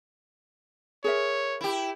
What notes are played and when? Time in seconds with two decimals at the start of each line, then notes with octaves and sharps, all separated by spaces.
1.04 G#4 A#4 C#5 E5
1.61 E4 G4